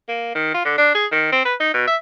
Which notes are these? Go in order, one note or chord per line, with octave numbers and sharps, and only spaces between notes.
A#3
D#3
F4
D3
D4
G#4
D#3
C4
B4
D#4
B2
E5